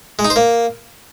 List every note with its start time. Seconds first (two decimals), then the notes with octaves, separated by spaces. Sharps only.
0.19 G#3
0.25 D#4
0.30 C5
0.36 A#3